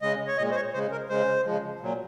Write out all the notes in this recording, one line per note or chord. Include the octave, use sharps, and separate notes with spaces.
C#3 G#3 D#5
C#5
A#2 G#3 D#5
C5
C#5
C#3 G#3 C5
A#4
C#3 G#3 C5
C#3 F3 G#3
A#2 F#3